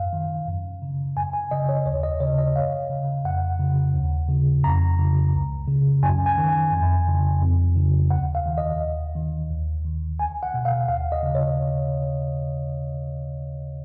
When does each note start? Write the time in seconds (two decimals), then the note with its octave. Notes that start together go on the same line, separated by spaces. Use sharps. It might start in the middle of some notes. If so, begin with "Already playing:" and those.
Already playing: F#2 F5
0.13 D#3
0.47 F#2
0.82 C#3
1.16 F#2 G#5
1.33 G#5
1.51 C#3 D#5
1.69 C#5
1.86 D#2 C#5
2.03 D#5
2.20 C#3 C#5
2.38 D#5
2.56 F#2 F5
2.90 C#3
3.25 F2 F#5
3.60 C#3
3.94 D#2
4.29 C#3
4.63 F2 A#5
4.99 C#3
5.34 C#2
5.68 C#3
6.03 F#2 G#5
6.26 G#5
6.37 D#3
6.49 G#5
6.72 F2
7.07 C#3
7.41 F2
7.76 C#3
8.11 D#2 F#5
8.35 F5
8.46 D#3
8.58 D#5
8.81 D#2
9.15 D#3
9.50 D#2
9.85 D#3
10.19 C#2 G#5
10.43 F#5
10.54 B2
10.65 F5
10.89 D#2 F5
11.12 D#5
11.23 C#3
11.35 C#5